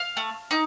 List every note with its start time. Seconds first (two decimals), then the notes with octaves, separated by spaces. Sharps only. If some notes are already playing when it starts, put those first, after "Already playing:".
Already playing: F5
0.17 A3
0.51 D#4